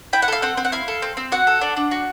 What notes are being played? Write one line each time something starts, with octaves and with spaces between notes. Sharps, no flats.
E4 G5
F#5
A4 F5
C4 F#5
C4
F#5
E4 F5
A4
C4
C4
F#4 F#5
A4
D4
D4
F#4